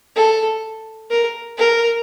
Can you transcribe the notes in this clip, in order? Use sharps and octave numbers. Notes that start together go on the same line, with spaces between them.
A4
A#4
A#4